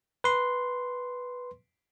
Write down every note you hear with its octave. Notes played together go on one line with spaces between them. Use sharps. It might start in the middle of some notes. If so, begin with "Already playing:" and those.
B4 C6